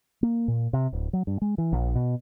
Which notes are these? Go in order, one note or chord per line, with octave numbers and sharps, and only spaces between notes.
A#3
A#2
C3
D1
F#3
G2
G#3
E3
A#1
B2